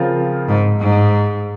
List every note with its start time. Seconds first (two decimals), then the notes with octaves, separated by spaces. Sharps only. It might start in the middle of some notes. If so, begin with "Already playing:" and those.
Already playing: C#3 F3 C4 F4 A#4
0.48 G#2
0.80 G#2